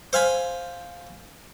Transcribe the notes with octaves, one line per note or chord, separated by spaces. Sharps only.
C5 F5 G#5 B5